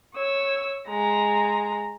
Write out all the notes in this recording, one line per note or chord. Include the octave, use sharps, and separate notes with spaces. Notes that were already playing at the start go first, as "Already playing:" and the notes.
C#5 E6
G#3 A#5